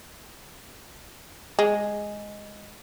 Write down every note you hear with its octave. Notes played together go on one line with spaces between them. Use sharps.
G#3